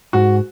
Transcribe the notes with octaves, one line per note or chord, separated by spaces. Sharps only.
G#2 F#4